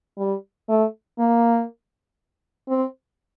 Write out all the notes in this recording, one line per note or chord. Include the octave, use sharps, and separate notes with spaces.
G3
A3
A#3
C4